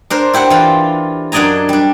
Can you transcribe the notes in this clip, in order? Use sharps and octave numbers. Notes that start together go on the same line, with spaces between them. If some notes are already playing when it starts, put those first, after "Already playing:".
D4 A#4 C5
E4 G4 C5 F#5
E3 F4
F#2 D4 D5 D#5 G#5 A#5
G3 D4